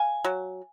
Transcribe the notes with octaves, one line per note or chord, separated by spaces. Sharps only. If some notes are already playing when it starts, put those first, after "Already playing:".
Already playing: F5 G#5
F#3